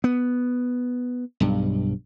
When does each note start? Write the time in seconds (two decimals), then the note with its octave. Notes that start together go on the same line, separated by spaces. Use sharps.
0.04 B3
1.40 B1 G2